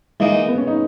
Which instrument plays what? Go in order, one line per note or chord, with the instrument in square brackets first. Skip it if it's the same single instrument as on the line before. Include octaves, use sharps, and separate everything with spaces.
[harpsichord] E3 A#3 D#4 [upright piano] G#3
[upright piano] B3
C#4
D#4